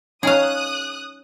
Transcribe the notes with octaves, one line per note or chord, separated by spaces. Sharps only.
C#4 D#4 G#4 C#5 F5 D#6 F#6